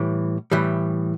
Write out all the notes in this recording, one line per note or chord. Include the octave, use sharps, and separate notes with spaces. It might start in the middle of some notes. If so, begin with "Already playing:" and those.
Already playing: A2 E3 G3
A2 E3 G3